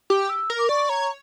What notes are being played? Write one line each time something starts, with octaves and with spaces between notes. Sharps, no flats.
G4 D6
E6
A#4
D6
D5 C#6
C#5 A#5